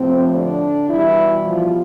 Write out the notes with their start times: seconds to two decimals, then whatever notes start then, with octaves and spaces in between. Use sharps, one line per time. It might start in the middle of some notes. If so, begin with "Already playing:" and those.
Already playing: A2 C3 F3 C4
0.32 D3 D4
0.89 B2 E3 G3 E4
1.45 F3 F4